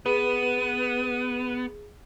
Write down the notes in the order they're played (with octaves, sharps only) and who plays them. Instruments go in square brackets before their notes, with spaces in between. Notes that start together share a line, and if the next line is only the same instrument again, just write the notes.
[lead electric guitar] B3 [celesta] G#4 [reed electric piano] B4 [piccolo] D#7